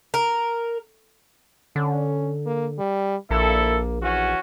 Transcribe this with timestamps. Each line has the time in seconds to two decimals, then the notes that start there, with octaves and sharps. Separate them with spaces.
0.14 A#4
1.76 D3 C#4
2.46 A#3
2.78 G3
3.31 A#1 A#3 E4 A4
4.02 E3 C#4 F#4